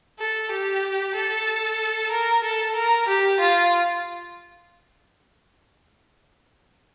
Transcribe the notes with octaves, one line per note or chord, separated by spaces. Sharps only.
A4
G4
A4
A#4
A4
A#4
G4
F4